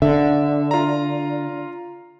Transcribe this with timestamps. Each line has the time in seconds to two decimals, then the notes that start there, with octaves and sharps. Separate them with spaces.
0.02 D3 E5
0.71 F4 A#5